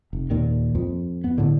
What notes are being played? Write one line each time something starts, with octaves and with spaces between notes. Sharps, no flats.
F1
D#2 A#2 D#3
F2
B3
A2 D3